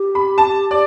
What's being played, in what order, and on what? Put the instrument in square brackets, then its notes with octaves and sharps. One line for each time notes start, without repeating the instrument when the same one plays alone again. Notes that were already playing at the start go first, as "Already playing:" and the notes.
Already playing: [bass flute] G4
[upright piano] B5
A5
D5